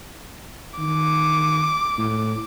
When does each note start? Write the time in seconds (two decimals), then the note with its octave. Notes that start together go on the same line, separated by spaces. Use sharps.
0.79 D#3 D6
1.98 A2